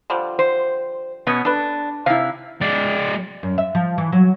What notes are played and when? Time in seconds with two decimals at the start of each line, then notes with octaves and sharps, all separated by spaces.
0.10 D3 F3 G3
0.39 C5
1.27 B2 B3 C#4
1.45 D4 A4 B4
2.06 C3 E4 F5
2.61 G#3 D5
3.43 F#2
3.58 E5
3.75 F3
3.98 E3
4.12 F#3